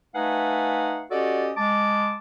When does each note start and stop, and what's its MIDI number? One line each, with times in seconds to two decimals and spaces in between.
0.15 1.04 57
0.15 1.04 63
0.15 1.04 71
0.15 1.04 77
0.15 1.04 78
0.15 1.04 80
1.11 1.51 61
1.11 1.51 66
1.11 1.51 67
1.11 1.51 69
1.11 1.51 74
1.11 1.51 75
1.57 2.17 56
1.57 2.17 81
1.57 2.17 86